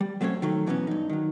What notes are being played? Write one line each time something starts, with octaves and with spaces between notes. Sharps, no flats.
G3
F#3 A3 C4 C#4 C#5
D#3 F#3 A3
B2 E3 F#3 G3 B3 C#4
G2 D#4
D#3 F#3